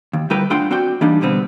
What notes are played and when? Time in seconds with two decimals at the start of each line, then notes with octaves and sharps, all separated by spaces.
0.13 D#2
0.30 D2 G3 E4 A#4 B4 G5
0.50 A2 D4 F4 F#5 G5 C6
0.71 C4 F#4 D5 G5
1.01 E3 G3 A#3 D4 D#4
1.21 B2 D3 G3 B3 C4